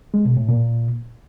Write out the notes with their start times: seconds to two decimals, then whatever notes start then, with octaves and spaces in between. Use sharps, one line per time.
0.14 G#3
0.25 B2
0.37 A2
0.49 A#2